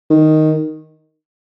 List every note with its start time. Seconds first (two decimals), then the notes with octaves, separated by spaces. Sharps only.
0.10 D#3